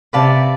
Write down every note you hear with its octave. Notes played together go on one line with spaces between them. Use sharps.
C3 B4 D5 F5 A5